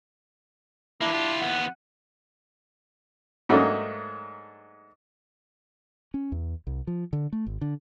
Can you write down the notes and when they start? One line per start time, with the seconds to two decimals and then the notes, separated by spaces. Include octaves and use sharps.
1.01 E3 A#3 D4 E4
1.13 D4 F4 G4
1.40 D#2 B3 F#5
3.49 G#2 F#3 A3 A#3 D4 D#4
6.14 C#4
6.32 E2
6.67 C2
6.87 F3
7.13 D3
7.33 A3
7.46 G#1
7.61 D3